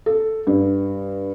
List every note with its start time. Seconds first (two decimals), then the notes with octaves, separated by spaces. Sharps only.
0.06 A4
0.47 G2